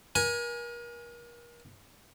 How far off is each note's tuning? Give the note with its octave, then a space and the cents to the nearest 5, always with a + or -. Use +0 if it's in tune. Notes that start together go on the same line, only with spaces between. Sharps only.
A#4 +35 G#5 +0